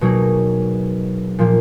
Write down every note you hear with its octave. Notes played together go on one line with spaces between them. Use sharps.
B2 F#3 A#3 D#4 G#4
A#2 F3 A#3